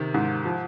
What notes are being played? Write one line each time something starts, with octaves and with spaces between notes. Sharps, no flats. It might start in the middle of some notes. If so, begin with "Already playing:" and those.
Already playing: C3 D#3
G#2
F3